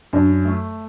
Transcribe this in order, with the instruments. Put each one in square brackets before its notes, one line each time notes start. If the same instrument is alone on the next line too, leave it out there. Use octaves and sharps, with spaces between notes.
[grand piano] F#2 [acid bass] D4
[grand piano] A3